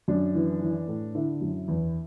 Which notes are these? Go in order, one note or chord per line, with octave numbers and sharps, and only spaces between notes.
F#2 D4
E3
E3
A2
D3 E4
F#2
E2